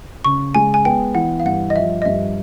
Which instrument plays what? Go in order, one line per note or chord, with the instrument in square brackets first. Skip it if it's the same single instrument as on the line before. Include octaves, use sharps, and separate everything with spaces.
[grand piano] C#3 [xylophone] C#6
[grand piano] G#3 [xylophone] G#5
[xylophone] G#5
[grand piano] B3 [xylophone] G5
[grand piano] E3 [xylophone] F#5
[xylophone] F5
[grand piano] G2 [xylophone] F#5
[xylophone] D#5
[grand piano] F3 [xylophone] E5
[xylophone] D#5
[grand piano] G2 [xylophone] E5